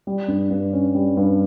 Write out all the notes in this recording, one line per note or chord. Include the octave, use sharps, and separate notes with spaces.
G3
G2
G2
C#4
G3
G2